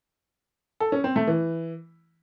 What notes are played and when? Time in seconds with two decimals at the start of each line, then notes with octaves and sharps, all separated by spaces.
0.80 A4
0.92 C#4
1.04 C4
1.16 A3
1.27 E3